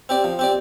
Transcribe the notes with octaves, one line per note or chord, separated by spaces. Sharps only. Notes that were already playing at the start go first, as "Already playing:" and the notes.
C4 G4 D5
F3
C4 G4 D5